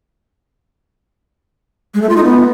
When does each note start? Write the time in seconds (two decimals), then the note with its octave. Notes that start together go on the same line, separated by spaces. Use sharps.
1.94 G#3
2.02 A3
2.09 F4
2.17 D#4
2.24 B3